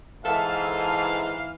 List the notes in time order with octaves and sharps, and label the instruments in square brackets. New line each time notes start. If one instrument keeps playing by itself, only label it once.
[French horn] G#2 [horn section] E3 F5 [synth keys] A4 E5 A5